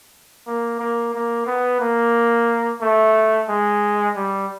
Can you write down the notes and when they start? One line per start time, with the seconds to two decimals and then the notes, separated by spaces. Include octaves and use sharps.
0.47 A#3
0.80 A#3
1.14 A#3
1.47 B3
1.81 A#3
2.81 A3
3.49 G#3
4.16 G3